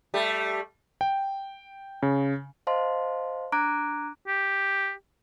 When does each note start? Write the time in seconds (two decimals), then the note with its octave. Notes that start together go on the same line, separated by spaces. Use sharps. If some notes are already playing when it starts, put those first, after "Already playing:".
0.14 G3 A3
1.01 G5
2.03 C#3
2.67 C5 D#5 F5 A5 C6
3.52 D4 A#5 D6 F#6 G#6 D7
4.27 G4